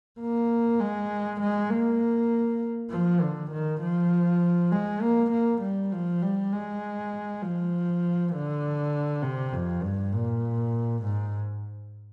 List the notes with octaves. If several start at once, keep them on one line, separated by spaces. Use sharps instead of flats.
A#3
G#3
G#3
A#3
F3
D3
D#3
F3
G#3
A#3
A#3
G3
F3
G3
G#3
F3
D3
C3
F2
G2
A#2
G#2